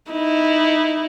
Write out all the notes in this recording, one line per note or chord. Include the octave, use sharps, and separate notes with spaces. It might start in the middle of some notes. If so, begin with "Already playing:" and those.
D#4 E4